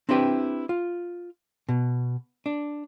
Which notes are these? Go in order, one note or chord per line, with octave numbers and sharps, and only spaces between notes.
C4 D4 E4 G4 B4
F4
B2
D4